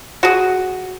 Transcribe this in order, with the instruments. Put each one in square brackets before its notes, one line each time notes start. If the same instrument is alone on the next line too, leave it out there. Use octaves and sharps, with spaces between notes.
[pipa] F#4 G#4